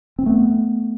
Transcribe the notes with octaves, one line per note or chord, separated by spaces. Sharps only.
C4
A3 B3